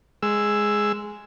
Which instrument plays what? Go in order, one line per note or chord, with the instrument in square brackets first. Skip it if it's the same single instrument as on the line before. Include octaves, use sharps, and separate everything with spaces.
[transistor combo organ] G#3 E6